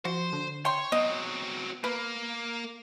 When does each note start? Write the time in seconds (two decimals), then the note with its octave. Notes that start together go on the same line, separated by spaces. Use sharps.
0.05 F3 F#4 C5
0.33 D3
0.65 C#5 G5 C6
0.92 F#3 B3 C4 D#5
1.84 A#3 B4